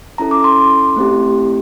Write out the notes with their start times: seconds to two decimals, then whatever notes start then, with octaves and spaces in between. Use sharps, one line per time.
0.18 C#4 E4 A4 A#5
0.31 D6
0.44 C6
0.96 A3 C4 E4 G4